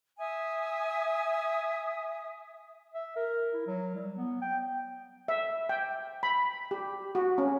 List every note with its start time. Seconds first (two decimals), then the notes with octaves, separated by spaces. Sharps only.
0.18 E5 G#5 D#6
2.94 E5
3.16 A#4
3.54 E4
3.67 F#3
3.95 G3
4.16 B3
4.42 G5
5.28 E5
5.69 G5
6.23 B5
6.71 G4
7.15 F#4
7.38 C#4